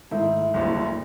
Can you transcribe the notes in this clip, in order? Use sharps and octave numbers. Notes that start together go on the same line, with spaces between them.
G#2 D#3 A3 E4 E5
F#1 D2 G2